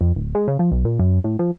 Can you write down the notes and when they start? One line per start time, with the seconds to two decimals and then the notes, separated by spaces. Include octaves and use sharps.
0.01 F2
0.16 D1
0.35 G#3
0.48 C#3
0.59 F3
0.72 B1
0.85 A#2
0.99 F#2
1.24 A2
1.39 F3